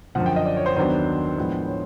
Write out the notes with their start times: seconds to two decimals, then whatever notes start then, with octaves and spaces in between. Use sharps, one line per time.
0.15 F#2 D3 F3 F#5
0.26 G5
0.36 D#5
0.46 D5
0.57 C#5
0.66 C5
0.77 D#2 D#3 F#3 B3 D4 C5
1.38 A2 F3 G#3 B3 D4
1.68 C#5